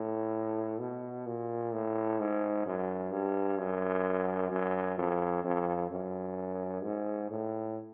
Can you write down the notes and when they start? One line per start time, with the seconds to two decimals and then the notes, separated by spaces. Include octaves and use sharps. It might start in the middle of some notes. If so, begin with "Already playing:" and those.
Already playing: A2
0.80 B2
1.27 A#2
1.73 A2
2.20 G#2
2.66 F#2
3.12 G2
3.59 F#2
4.51 F#2
4.98 F2
5.44 F2
5.90 F#2
6.83 G#2
7.30 A2